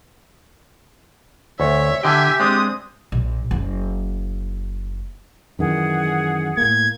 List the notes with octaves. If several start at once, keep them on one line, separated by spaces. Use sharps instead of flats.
D2 C#5 E5
D3 G4 E5 G5 G#5
G#3 C4 D4 D#6
A#1
F#1
F#2 D#3 E3 G#4 F#5
A2 A#3 G#6